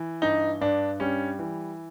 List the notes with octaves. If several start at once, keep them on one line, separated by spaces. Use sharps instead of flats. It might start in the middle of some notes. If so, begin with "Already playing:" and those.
Already playing: E3
G2 D#4
G2 D4
G3 C#4
E3